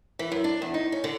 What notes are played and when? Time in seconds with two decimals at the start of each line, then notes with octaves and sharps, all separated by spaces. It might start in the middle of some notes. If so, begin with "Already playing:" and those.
0.19 E3
0.32 F#2
0.44 D4
0.62 E2
0.74 D#4
0.92 C#4
1.04 D3